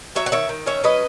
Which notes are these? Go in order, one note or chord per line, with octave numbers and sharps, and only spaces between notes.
F#3 C#5 E5
F#5
D#3 C#5 E5
D#3
C#4 C#5 E5
F#3 B4 D#5